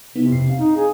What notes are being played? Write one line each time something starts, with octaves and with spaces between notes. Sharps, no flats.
C3 B3 D#4 E4
F2 B2 C7
C4 F5
D#4
G#4